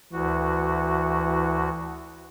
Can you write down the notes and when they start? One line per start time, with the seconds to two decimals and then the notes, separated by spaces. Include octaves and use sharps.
0.13 D2 E3 F#4